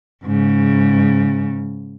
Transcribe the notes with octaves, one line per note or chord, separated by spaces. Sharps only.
G#2 C#3